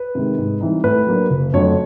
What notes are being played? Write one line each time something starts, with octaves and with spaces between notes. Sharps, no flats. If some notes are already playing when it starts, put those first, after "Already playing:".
Already playing: B4
C3 D#3 G#3
G#2
E3 G3 C4 D#4
A2 B4
F#3 A#3 D4
F#1
F2 D3 F#3 A3 C#5